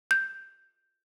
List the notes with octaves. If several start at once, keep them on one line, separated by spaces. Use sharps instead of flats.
G6